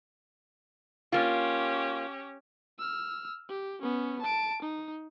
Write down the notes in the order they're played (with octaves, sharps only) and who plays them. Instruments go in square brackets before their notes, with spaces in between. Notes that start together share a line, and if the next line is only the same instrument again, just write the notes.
[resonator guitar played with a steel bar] A#3 F4 [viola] C#4 G4
[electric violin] E6 F6
G4
B3 C#4
A5 D7
D#4